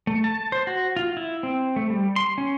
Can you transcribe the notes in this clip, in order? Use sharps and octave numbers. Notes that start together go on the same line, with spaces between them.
A3
A5
C5
F#4
F4
E4
C4
A3
G3
C6
C#4